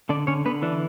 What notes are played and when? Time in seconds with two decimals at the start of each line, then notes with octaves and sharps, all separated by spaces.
0.09 D3 D4 D5
0.27 D3 C#4 C#5
0.45 D3 B3 B4
0.62 E3 D4